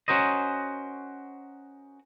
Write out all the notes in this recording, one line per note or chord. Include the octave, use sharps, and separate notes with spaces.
C#4 F#4 A#4 C5 D#5